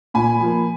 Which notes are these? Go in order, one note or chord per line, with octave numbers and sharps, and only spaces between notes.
A#2 G#5 B5
F3 A#3